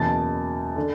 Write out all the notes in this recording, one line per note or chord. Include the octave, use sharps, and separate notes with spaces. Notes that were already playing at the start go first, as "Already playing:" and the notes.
Already playing: F#1 E2 B2 A5 A6
D3